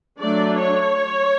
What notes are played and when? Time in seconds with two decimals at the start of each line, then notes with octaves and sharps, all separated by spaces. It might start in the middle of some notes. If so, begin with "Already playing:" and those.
0.20 F#3 A3 D4 D5
0.58 C#5